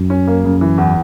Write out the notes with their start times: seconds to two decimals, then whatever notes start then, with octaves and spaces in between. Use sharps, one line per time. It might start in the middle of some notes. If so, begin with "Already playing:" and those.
Already playing: F#2
0.10 C#4
0.27 A#3
0.45 C#3
0.61 E3
0.78 E2